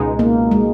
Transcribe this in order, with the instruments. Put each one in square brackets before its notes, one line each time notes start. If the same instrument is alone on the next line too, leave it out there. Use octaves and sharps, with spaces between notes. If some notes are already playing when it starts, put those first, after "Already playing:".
Already playing: [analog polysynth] C#2 B2 G#3 D#4
[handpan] A#3
G#3